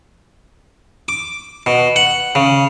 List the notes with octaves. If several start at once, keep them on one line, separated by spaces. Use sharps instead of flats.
D6
B2
F#5
C#3